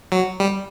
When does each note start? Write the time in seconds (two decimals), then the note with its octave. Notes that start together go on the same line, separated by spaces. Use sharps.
0.12 F#3
0.40 G3